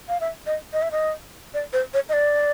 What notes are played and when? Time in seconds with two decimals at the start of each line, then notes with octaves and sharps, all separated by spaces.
0.08 F5
0.20 E5
0.46 D#5
0.73 D#5
0.82 E5
0.92 D#5
1.54 D5
1.73 C5
1.94 C#5
2.09 D#5
2.13 D5